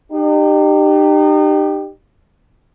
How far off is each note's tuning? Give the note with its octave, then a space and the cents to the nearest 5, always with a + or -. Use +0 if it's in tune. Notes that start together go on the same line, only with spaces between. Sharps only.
D#4 -40 G4 +0